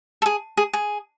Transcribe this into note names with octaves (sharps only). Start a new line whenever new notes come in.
A4
G#4
G#4
G#4